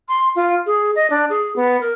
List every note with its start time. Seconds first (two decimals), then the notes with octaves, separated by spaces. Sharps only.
0.08 C6
0.36 F4
0.66 G#4
0.95 D#5
1.10 D4
1.29 G#4
1.56 B3
1.81 A#4